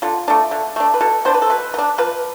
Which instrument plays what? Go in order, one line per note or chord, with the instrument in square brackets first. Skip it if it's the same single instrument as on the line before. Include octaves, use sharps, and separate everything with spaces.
[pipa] D3 F4
A3 D4
D3
A3 D4
B4
B2 A4
B3 D4 C5
B4
A4
B2 B4
B3
D4
F3 B4